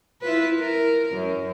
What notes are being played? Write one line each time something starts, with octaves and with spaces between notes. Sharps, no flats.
E4 F4 B4
A#4
F#2